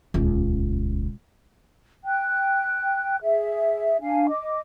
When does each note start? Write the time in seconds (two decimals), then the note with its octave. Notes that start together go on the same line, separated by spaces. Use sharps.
0.14 D#1 C#2
2.04 G5 F#6
3.22 G#4 E5
4.02 D4 F5 G#5
4.29 D#5 D6